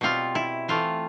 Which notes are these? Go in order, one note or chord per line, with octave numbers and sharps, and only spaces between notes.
B2 G3 C4 F4
E4
E3 A3 C4 F4